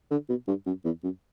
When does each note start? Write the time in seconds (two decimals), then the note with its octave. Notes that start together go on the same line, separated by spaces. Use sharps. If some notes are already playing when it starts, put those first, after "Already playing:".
0.11 D3
0.29 B2
0.48 G2
0.66 F#2
0.85 E2
1.03 F#2